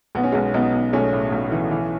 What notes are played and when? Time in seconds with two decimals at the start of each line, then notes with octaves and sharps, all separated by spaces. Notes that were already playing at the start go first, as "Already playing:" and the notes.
0.15 B1 B3
0.23 C#4
0.32 B1 G#3 B3
0.54 B1 B3 D#4
0.74 B1
0.93 B1 A3 C#4
1.13 A2
1.32 B1
1.52 E3
1.71 E3